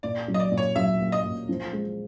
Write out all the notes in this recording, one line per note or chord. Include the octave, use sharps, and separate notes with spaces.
A#2 D5
F#3
D#5
D5
A#2
C#5
F#3 E5
A#3
D#5
A#2
F3
G#3